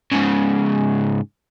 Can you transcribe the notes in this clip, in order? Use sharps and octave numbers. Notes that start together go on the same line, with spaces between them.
G#2 C#3